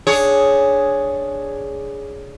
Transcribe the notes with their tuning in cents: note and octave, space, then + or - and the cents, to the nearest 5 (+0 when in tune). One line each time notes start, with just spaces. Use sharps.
D4 +0 G#4 +0 C#5 +0